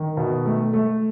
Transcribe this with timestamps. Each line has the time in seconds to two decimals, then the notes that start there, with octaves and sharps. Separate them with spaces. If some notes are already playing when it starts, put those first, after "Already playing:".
Already playing: D#3
0.17 B2
0.46 A3
0.73 A3